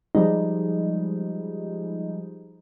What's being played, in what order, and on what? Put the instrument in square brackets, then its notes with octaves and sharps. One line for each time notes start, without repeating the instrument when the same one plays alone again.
[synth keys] F3 G3 G#3 D#4